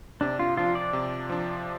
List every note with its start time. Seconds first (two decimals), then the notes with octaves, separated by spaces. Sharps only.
0.21 C3 D4
0.39 F4
0.57 F3 D4 F4
0.75 D5
0.93 C3
1.29 F3 D4